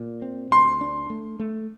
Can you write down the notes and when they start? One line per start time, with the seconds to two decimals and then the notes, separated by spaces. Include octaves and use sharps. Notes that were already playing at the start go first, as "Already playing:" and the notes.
Already playing: A#2
0.22 C4
0.51 D2 C6
0.81 D4
1.10 A3
1.40 A3